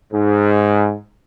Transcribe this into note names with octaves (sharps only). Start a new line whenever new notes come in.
G#2